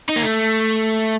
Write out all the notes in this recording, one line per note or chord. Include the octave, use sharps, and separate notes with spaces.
D#4
A#3
A3